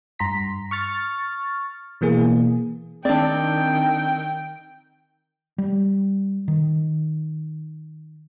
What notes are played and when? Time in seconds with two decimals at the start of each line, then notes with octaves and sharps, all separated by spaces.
0.19 G2 A#5 C6 B6
0.71 C#6 F6 A6
2.01 B2 E3 A#3 G#4
3.05 D#3 C4 D4 D5 G5
5.58 G3
6.48 D#3